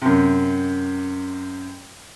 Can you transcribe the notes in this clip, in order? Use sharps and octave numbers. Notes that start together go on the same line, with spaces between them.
F#2 C3